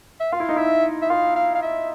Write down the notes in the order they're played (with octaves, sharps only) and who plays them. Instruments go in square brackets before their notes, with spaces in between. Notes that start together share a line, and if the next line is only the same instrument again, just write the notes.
[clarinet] E5
[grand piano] F4 [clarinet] F5
[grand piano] E4
D#4
[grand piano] E4 [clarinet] E5
[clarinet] E5
[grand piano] F4 [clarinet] F5
[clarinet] F5
F5
E5